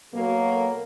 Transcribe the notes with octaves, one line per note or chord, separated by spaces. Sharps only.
B2 F#3 A#3 A4 A#4